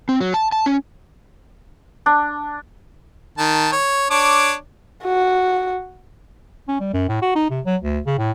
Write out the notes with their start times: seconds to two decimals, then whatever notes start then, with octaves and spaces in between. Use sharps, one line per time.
0.09 C4
0.21 F#3
0.34 A5
0.52 A5
0.66 C#4
2.06 D4
3.38 D#3 A5
3.72 C#5
4.11 D4 C#5 D6
5.04 F#4
6.68 C#4
6.80 G3
6.94 F#2
7.09 A2
7.22 F#4
7.35 D#4
7.50 C3
7.66 F#3
7.82 D2
8.06 C#3
8.19 A2